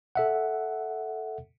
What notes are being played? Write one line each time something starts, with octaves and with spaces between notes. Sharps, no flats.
A4 E5 F#5